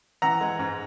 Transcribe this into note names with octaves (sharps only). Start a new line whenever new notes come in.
E3 F#5 A#5
G#3
G#2